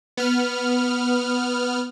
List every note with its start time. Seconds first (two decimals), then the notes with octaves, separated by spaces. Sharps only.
0.17 B3 F6